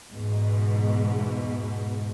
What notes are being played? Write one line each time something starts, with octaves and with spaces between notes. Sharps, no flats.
E2 G#2 B2